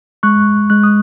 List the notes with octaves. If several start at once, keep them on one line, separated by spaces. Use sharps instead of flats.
G#3 C#6 F#6
G#3 F#6
D#6